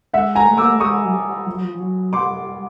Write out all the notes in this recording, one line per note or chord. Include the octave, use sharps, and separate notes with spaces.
G#3 E5 F#5
G#5 A#5
A3
A#3 D6 E6
A3
G#3 C#6 D#6
F#3
G3
F3
F#3
F3
F3
F#3
G3 C6 D6
G3